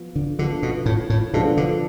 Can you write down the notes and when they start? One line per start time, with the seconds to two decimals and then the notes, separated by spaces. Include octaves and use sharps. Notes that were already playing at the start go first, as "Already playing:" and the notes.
Already playing: F3 B3 F4
0.16 D3
0.39 D3 F3 B3 D4 F4 A4
0.63 B2
0.86 A2
1.10 A2
1.33 B2 F3 B3 D4 F4 A4
1.57 D3